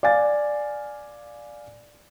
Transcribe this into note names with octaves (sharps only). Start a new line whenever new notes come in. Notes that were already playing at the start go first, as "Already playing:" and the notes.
D5 F5 G#5 A6